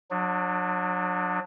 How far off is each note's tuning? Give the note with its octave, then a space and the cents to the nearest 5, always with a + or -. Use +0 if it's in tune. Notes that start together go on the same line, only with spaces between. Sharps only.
F#3 -30 D4 +25